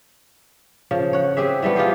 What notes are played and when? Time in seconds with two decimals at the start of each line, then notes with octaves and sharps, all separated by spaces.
0.91 C#3 F3
1.13 C#5 F#5
1.37 C4 G4 G#4 E5
1.62 E3 G3 A3 B3
1.76 F4 G4 G#4 C5